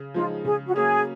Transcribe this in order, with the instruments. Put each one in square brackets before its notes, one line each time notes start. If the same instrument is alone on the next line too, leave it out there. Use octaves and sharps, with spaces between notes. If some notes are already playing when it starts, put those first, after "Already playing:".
Already playing: [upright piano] C#3
[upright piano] F3 G#3 D#4 [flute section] F4
[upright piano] C#3 [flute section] G#4
[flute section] F#4
[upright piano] F#3 A#3 C#4 [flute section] G#4